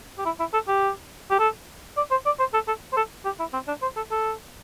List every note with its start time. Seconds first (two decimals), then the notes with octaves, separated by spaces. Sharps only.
0.18 G4
0.25 E4
0.40 E4
0.53 A4
0.68 G4
1.30 G4
1.39 A4
1.97 D5
2.11 C5
2.26 D5
2.39 C5
2.54 A4
2.68 A4
2.92 C5
2.97 A4
3.25 G4
3.39 E4
3.53 C4
3.68 D4
3.82 C5
3.97 A4
4.11 A4